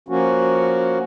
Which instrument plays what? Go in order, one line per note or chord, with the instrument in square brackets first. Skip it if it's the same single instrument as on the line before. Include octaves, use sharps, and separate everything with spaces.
[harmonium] F3 A#3 C#4 F#4